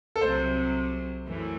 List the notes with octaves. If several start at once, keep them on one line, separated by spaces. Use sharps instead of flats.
A4
C2 C3 F#3 C5
F#2 E3 A3